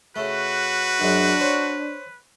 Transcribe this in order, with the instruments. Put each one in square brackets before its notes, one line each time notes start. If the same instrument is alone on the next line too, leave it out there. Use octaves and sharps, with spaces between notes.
[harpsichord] C#3 A3 [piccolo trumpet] F#4 [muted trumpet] B4
[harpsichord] F#2 G#3 [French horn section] D4
[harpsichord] C5 C#5